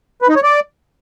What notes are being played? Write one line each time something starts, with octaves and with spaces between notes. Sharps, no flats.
B4
D#4
C#5
D5